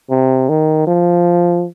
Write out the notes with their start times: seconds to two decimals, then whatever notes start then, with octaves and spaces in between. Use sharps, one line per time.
0.10 C3
0.49 D#3
0.87 F3